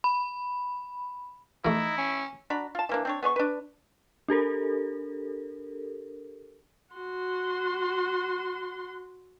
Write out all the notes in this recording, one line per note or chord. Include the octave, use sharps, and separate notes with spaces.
B5
E3 A3 D#4 E4
C#4
D4 F#4 A#5 B5
F4 A5
E3 A#3 D4
C4 D4 C#5
B3 G#4 C#5 C#6
D4 B4
D4 G4 A4 A#4
F#4 C6